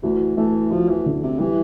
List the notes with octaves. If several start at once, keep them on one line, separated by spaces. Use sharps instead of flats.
D2 E3
E3 A3
D2 F3
E3
D3
C3
E3 G3